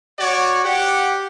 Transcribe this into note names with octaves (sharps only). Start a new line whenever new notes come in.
F#4 C#5 D5
G4 F#5